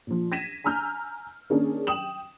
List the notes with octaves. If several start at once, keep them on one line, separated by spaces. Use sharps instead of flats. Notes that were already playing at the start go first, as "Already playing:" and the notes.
A#2 F3
G#6 A#6 B6 D#7 E7
G#5 A#5 E6 F6 G6
D#3 A#3 C#4 D4 G#4 A#4
G5 D#6 E7 F#7